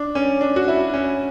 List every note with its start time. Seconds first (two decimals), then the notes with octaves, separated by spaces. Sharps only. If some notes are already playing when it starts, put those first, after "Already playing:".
Already playing: D4
0.15 C#4
0.41 D4
0.56 F#4
0.68 E4
0.94 C#4